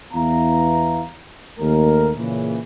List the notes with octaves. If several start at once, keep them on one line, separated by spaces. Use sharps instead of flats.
E2 B3 E4 F5 A#5
D#2 A3 A#4
A#2 C#3 E3